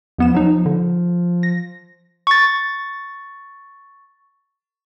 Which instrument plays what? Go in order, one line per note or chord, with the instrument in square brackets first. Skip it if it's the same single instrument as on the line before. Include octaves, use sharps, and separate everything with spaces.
[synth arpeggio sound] E2 B3 E7 [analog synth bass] F3
[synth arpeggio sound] F#3 D#4
D3
A#6
[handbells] C#6 A6